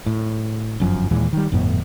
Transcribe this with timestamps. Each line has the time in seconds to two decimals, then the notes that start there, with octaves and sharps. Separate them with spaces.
0.06 A2
0.80 G1 F#2 F3
1.11 D#2 A#2 E3 G#3
1.33 D#3 G3
1.52 G1 F2 A2 B3